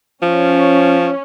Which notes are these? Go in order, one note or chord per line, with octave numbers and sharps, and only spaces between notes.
F3 C#4